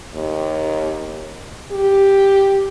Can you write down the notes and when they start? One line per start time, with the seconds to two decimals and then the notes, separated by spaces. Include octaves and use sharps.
0.14 D#2
1.72 G4